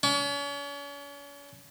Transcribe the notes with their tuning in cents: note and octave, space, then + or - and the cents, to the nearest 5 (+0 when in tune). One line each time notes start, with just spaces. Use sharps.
C#4 +40